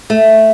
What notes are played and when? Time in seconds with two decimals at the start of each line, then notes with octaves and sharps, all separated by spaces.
0.10 A3